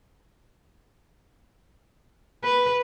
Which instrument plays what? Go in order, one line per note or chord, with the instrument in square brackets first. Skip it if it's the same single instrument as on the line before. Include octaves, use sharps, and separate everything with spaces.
[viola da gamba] B4